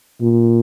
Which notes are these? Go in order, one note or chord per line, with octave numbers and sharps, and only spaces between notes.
A#2